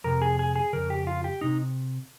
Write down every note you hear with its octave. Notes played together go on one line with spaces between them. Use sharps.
F2 C3 A#4
G#4
G#4
G#4
F2 C#3 A#4
G4
F4
G4
C3 D#4